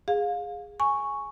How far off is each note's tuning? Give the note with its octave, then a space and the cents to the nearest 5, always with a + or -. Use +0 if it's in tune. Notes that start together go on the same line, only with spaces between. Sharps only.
G#4 -15 F5 +25
G#5 +0 C#6 +0